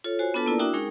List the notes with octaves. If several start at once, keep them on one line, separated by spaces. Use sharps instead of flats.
F4 A4 C#5
F4 F#4 C5 C#5 G#5
B3 D4 F4 A4 B4 A5
A#3 E4 A#4 D5
D4 E4 F#4 E5 G5 D#6
G#3 C#4 D#4 G#4 A#4 G5